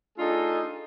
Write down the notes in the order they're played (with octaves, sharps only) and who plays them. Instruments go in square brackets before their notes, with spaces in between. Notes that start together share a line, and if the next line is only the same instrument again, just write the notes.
[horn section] A3 D4 D#4 F4 G#4 A4